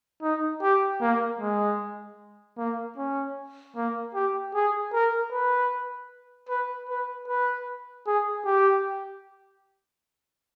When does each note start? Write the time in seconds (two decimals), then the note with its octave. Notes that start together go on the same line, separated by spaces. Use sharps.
0.23 D#4
0.62 G4
1.01 A#3
1.40 G#3
2.58 A#3
2.97 C#4
3.76 A#3
4.15 G4
4.54 G#4
4.93 A#4
5.32 B4
6.49 B4
6.90 B4
7.28 B4
8.07 G#4
8.45 G4